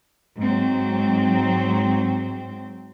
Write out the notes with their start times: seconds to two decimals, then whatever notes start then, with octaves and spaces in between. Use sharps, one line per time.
0.40 G#2 F#3 C4